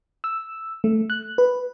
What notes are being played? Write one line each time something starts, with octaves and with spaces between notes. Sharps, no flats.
E6
A3
F#6
B4